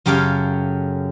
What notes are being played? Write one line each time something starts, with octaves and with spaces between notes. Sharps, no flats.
F#2 C#3 G4 A4 C#5 F5